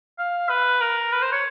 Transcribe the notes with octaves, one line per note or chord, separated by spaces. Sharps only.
F5
B4
A#4
B4
C5
C#5